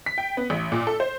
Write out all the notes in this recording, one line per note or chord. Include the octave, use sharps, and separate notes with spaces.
B6
G5
B3
A1
A#2
A4
C5